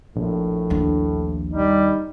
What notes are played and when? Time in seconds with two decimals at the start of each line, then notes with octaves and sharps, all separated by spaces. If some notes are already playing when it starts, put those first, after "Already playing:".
0.16 A#1 A2
0.70 D#2 D4
1.52 G3 D#4